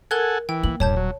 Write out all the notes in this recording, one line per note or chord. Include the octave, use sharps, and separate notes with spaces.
A4 A#4 F#5 G#5 F#6 G#6
E3 G5
A#3 F#7
D#1 G2 C#5 A5 G6
F#3